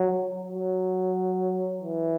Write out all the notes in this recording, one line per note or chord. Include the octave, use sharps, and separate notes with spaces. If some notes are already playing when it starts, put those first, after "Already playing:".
Already playing: F#3
F#3
E3